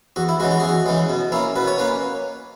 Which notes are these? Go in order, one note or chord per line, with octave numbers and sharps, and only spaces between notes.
E2 F#4
E4
C#3 E3 G#3 F#4
F#4
G#4
E2
F#4
C#3 E3 G#3
B2
A#3 C#4 E4
B2 B4
C#5
A#3 C#4 B4